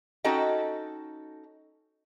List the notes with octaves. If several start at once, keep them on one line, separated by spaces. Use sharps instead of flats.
C#4 D#4 F#4 A4 D#5 G5